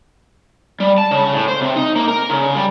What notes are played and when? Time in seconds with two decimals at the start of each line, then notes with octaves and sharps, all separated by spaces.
0.80 G3
0.98 A5
1.11 C#3
1.33 A2
1.48 C5
1.61 C3
1.76 D#4
1.96 A#3
2.08 A#4
2.30 C#3
2.55 G3